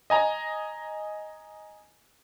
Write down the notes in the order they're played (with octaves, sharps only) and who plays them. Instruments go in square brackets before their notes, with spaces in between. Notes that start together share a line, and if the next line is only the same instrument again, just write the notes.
[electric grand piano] D#5 G#5 A#5